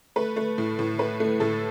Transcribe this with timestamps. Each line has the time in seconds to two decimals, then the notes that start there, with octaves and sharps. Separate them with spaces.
0.16 A3 B4
0.36 A3
0.58 A2
0.79 A2
0.99 A3 B4
1.20 A3
1.40 A2 A4